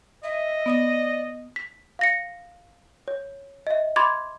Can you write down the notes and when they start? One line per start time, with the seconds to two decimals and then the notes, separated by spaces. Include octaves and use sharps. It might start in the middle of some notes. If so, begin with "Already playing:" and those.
0.23 D#5 E5
0.66 B3 D5 D#6 A#6
1.56 B6
1.99 F5 A#6 C#7
3.08 C#5
3.67 D#5 E5
3.96 B5 C6 D6 G#6 A6